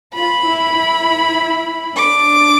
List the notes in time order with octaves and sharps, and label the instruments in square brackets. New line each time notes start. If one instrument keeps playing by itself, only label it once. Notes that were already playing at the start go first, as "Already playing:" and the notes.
[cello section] F4 [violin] B5
[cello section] E4
E4
[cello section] D4 [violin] D6